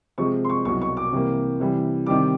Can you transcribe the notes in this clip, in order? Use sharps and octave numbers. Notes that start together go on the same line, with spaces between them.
C3 F3 G#3 C4 C#6
C6
C#6
C2 B2 F#3 C#6
C#6
D6
C3 E3 G3 A#3
C3 E3 G3
C3 D#3 G3 D6